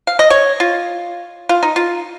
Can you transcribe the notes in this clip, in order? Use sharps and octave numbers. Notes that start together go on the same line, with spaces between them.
F5
D#5
C#5
F4
F4
D#4
F4